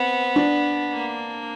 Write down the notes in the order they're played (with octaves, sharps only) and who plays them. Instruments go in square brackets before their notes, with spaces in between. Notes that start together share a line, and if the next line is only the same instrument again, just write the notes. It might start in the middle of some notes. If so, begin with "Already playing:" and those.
Already playing: [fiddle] B3 [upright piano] C4
[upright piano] D4
[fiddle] A#3